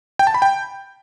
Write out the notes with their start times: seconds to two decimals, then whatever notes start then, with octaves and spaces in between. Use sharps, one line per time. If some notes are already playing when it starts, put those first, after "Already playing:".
0.19 G5
0.27 A5
0.34 B5
0.42 G5